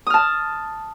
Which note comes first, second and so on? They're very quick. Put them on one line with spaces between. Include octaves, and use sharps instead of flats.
D#6 F6 A5